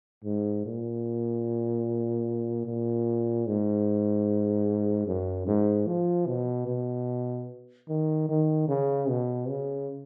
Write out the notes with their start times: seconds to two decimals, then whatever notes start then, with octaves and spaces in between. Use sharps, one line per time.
0.24 G#2
0.65 A#2
2.65 A#2
3.47 G#2
5.07 F#2
5.47 G#2
5.87 F3
6.27 B2
6.67 B2
7.88 D#3
8.29 D#3
8.68 C#3
9.09 B2
9.49 C#3